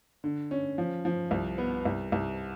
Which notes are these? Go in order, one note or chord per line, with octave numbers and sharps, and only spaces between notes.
D3
C#4
F3
F3
C2
B3
C2
C2